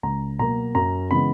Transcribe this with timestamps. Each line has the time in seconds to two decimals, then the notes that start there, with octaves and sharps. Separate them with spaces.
0.03 C#2 A#5
0.39 B2 F#3 A#3 A#5
0.75 F#2 A#5
1.11 C#3 E3 G#3 B3 B5